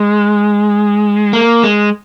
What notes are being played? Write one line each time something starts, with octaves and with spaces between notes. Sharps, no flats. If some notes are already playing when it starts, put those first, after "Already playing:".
Already playing: G#3
A#3
G#3